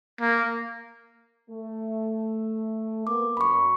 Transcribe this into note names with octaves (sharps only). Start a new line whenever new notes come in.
A#3
A3
A#3 B3 D6
F#2 B5 C#6